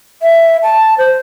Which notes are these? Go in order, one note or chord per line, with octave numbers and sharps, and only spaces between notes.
E5
A5
C5